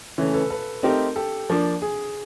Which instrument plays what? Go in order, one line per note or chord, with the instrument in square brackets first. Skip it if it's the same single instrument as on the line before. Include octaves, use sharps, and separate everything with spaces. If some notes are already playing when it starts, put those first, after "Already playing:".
[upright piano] C#3 E3 A3 C#4
[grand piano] A4 B4
A4 B4
[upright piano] A3 C4 D#4 G4 A#4
[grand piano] G4 A4
[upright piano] F3 A#3 D4
[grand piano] G#4